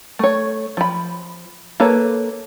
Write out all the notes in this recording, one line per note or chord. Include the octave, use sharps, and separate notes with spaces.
A3 C#5
F3 B5
A#3 A4 B4 C#5 A5